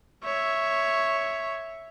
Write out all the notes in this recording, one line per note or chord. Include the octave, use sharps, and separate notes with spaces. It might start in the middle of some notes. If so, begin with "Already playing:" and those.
C#5 E5